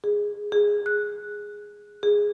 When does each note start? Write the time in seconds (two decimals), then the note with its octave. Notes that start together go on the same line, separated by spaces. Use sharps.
0.04 G#4
0.52 G#4
0.86 F#6
2.03 G#4